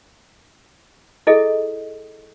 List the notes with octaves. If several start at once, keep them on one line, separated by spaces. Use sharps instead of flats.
E4 G#4 A4 D#5